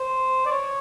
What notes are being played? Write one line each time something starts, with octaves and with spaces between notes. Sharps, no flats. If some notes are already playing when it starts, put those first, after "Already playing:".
Already playing: C5
D5
C#5